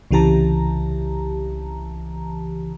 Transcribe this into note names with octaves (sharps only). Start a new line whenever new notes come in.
C2 C#3 E3 G4 A5 A#5